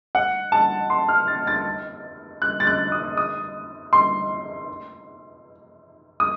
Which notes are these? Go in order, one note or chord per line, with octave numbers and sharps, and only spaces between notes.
F#5
A5
C6
F6
A6
A6
F#6
A6
F#6
D#6
D#6
C6
D#6